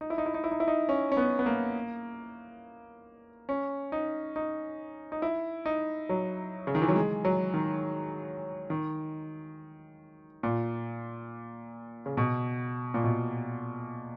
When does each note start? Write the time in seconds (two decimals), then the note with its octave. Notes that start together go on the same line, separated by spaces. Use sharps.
0.01 D#4
0.10 E4
0.18 D#4
0.26 E4
0.34 D#4
0.44 E4
0.52 D#4
0.60 E4
0.68 D#4
0.89 C#4
1.12 C#4
1.17 B3
1.39 B3
1.46 A#3
3.49 C#4
3.92 D#4
4.36 D#4
5.12 D#4
5.22 E4
5.66 D#4
6.09 F#3
6.67 C#3
6.75 D#3
6.82 E3
6.88 F#3
6.96 G#3
7.25 F#3
7.54 D#3
8.70 D#3
10.43 A#2
12.06 C#3
12.17 B2
12.94 A#2
13.04 B2